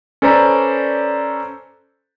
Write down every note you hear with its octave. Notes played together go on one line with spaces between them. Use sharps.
C#4 A4 B4 C5 D5 A#5